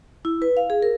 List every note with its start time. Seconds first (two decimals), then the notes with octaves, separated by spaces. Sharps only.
0.25 E4
0.42 B4
0.57 F5
0.70 G#4
0.82 A#4